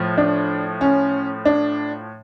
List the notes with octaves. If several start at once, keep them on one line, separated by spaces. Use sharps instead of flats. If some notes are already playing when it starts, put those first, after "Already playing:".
Already playing: A2 F3
D4
C#4
D4